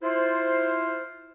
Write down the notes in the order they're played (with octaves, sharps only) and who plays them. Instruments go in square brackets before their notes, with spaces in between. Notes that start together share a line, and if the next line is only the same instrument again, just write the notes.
[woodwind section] E4 F4 C5